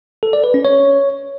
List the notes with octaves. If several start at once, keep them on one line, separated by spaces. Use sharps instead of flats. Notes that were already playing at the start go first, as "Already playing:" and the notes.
A4
D5
B4
C#4
C#5